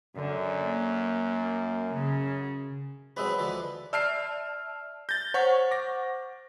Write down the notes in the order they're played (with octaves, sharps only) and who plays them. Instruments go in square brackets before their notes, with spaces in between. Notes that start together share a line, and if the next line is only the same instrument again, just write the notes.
[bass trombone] F#2 [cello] D3
[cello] A#3
C#3
[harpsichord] F#3 G#3 C4 [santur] B4 D#5 E5
[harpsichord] D2 D3 F3
[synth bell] D5 E5 A5 [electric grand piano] E6 F6 C7
[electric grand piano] G6 A6 [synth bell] A#6 G7
[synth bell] C5 F#5 C#6 [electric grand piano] C#5
[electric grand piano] D6 A#6